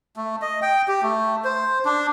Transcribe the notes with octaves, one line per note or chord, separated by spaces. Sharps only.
A3
D#5
G5
G4
A3
C5
D4